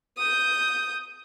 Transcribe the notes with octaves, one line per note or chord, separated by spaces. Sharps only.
D#6 G6